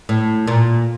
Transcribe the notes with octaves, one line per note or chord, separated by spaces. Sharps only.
A2
A#2